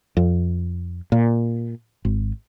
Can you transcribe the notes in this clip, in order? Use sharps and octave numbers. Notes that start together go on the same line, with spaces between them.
F2
A#2
G#1